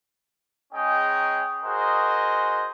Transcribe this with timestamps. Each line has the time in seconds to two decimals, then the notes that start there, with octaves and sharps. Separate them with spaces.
0.73 G#3 C#4 D#4 G#4 D#5 G5
1.64 F#4 G#4 A#4 C5 D#5